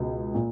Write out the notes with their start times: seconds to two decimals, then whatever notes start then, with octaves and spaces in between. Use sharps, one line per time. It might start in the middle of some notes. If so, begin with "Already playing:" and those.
Already playing: C#2 B2 G#3
0.34 A#2